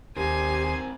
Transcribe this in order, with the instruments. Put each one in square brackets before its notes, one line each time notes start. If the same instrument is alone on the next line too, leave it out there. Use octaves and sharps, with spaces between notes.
[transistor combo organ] D#2 C5 [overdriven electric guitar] C4 A#4 [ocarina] G4 [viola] G#5